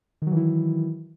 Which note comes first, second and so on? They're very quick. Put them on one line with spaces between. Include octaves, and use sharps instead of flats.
D#3 F#3 E3 E4